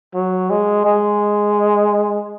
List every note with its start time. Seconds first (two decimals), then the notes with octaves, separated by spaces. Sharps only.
0.14 F#3
0.50 G#3
0.85 G#3